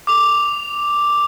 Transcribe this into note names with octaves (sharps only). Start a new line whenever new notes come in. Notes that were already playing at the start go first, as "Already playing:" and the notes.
D6 F7